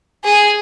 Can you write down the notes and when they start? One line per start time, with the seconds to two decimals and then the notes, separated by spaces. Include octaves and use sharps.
0.24 G#4